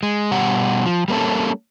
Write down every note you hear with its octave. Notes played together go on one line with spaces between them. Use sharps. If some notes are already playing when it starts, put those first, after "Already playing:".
G#3
B2 G3 G4 F#5
F3
G3 A#3 C#4 A4